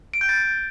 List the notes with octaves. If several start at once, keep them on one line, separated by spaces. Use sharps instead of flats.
D7
G6
A6